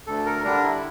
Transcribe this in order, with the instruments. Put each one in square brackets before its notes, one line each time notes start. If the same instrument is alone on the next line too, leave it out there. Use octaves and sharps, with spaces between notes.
[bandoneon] D2 A4
A#4
D3 G3 D4 A#4
E4